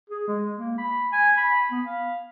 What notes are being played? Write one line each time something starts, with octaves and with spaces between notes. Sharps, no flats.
G#4
G#3
A#3
B5
G#5
B5
B3
F5